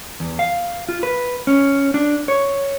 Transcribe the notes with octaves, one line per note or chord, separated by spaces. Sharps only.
E2
F5
F4
B4
C#4
D4
C#5